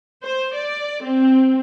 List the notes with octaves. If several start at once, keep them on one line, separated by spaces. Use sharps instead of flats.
C5
D5
C4